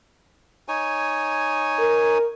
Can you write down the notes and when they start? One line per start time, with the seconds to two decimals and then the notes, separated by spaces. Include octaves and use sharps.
0.68 D#4 C#5 G#5
1.79 A#4